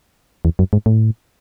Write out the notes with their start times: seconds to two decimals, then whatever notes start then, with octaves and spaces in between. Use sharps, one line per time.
0.45 E2
0.59 F#2
0.73 G#2
0.86 A2